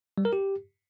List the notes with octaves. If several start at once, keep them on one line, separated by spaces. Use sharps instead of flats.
G3
A#4
G4